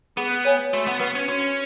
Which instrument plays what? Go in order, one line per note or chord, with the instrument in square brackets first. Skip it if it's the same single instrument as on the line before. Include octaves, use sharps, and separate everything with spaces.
[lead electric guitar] B3 [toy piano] G#4
[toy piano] C#5 G#5
[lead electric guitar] A3 [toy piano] F#4
[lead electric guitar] B3
[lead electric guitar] B3 [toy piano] B4 F#5 C#6
[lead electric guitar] C#4
[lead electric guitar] C#4 [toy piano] F#4